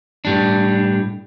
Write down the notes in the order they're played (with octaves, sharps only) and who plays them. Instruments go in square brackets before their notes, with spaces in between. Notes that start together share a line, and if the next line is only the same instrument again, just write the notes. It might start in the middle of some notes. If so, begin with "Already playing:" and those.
[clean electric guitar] A2 G3 D4